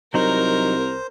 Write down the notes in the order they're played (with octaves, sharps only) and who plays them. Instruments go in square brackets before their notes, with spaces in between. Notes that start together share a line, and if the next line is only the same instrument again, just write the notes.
[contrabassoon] C2 [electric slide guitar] F#3 D#4 [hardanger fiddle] A#4 [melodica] C5